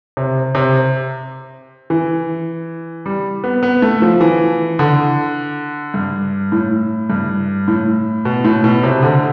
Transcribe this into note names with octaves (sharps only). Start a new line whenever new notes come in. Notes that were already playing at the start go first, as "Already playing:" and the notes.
C3
C3
E3
G3
B3
B3
A3
F3
E3
D3
G2
A2
G2
A2
B2
A2
B2
C3
D3